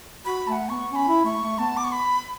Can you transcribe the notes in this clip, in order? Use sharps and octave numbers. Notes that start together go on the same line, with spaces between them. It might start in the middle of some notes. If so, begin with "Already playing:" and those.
F#4 B5
A3 A5
F#5
B3 C#6
C#4 B5 C#6
E4
A3 C#6
A3
B3 A5
D6
C#6
B5